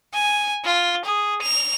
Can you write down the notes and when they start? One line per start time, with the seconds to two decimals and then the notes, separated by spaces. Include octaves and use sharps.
0.14 G#5
0.65 F4
1.05 G#4
1.42 F7